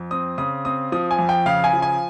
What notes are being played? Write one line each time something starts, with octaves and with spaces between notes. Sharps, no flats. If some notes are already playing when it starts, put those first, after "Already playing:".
Already playing: F2
C4 D#6
C#3 D#6
C4 D#6
F3 D#6
G#5
F2
G5
C#3 F5
G#5
F3
G#5